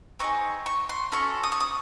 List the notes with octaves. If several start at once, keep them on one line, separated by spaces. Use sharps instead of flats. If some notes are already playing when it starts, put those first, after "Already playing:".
C4 D#4 G#4 C#6
C#6
C6
C#4 F#4 A4 C#6
D#6
C#6
D#6